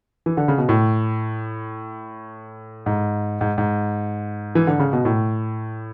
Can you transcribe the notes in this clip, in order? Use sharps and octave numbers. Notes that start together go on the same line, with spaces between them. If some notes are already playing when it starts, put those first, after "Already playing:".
E3
D3
C#3
B2
A2
G#2
G#2
G#2
E3
D3
C#3
B2
A2